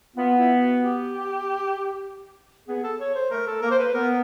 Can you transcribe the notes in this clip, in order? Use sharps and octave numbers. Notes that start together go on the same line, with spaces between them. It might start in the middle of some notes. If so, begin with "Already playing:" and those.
B3 F4
E4
F#4
G4
B3 G#4
A4
C#5
C5
A3 A#4
A4
A#3 A#4
C5
B4
B3 A#4